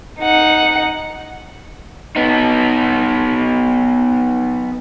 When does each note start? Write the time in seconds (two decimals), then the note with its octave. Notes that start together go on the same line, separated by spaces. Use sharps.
0.20 D#4 F#5
2.16 B3 D#4